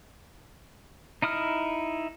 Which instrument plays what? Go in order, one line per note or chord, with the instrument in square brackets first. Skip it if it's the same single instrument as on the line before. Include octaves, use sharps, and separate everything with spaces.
[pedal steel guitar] D#4 E4 D#6 F6